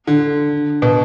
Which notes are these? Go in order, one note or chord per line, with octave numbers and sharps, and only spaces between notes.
D3
B2